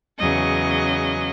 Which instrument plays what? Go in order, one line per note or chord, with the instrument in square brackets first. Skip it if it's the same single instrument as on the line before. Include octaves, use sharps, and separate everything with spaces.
[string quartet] E2 C#3 F#3 D#5